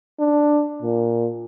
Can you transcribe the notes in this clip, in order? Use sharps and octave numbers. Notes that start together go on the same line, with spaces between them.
D4
A#2